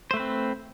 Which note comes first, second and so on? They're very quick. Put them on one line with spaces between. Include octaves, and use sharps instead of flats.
C5 A3 B4 C4